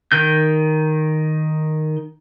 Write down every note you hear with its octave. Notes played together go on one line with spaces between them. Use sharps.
D#3 G6